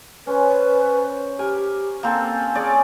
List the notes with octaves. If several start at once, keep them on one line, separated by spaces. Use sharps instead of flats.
C#4 B4 C5
G4 A#4 G#5
A#3 C4 A4 G#5
F4 G#4 C#5 D5